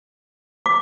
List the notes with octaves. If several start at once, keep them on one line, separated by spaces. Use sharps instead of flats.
D6